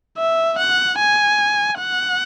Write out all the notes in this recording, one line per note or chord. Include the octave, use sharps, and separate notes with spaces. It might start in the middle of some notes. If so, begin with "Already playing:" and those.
E5
F#5
G#5
F#5